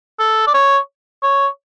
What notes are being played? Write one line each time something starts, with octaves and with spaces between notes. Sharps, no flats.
A4
D5
C#5
C#5